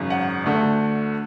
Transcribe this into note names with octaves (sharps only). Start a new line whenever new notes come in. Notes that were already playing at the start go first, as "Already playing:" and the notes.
Already playing: G#1 F#2 C#3
F#5
D2 D3 A3